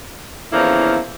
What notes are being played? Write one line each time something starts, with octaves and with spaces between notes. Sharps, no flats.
E2 D3 F3 A#3 C#4 E4